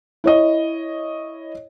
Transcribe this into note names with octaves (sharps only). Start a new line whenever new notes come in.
E4 C#5 D#5